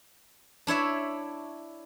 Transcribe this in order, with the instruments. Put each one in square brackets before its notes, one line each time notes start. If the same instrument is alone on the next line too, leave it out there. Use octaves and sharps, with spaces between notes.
[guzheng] D4 E4 C#5 E5